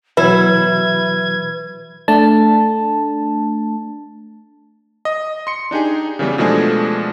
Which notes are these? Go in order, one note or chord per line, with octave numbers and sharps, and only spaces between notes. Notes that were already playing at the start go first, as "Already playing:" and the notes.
B2 E3 F#3 E4 B4 G#6
A3 D4 A5
D#5
C6 C#7
D4 D#4 G4 G#4
C#3 E3 G3 B3
B2 F3 G#3 A3 D4 G#4